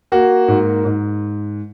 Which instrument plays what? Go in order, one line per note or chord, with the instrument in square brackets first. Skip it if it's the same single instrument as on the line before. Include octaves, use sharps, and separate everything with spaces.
[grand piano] A#3 F#4
G#2
G#2